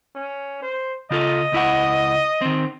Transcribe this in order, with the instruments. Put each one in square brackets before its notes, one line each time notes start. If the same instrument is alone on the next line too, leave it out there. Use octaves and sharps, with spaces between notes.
[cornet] C#4
C5
[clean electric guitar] C#3 F4 A4 [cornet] D#5
[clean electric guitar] C#2 E4 F#5
D#3 C4